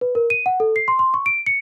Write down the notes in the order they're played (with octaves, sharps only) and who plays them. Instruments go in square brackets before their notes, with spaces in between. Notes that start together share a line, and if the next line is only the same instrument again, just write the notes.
[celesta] B4
A#4
D#7
F#5
A4
C7
C6
C6
C#6
D7
C#7